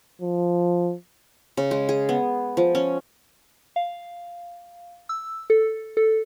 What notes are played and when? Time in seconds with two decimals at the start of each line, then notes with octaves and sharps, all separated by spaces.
0.21 F3
1.57 C#3
1.71 G#3
1.89 G#4
2.09 B3
2.57 F3
2.75 C#4
3.76 F5
5.09 E6
5.50 A4
5.97 A4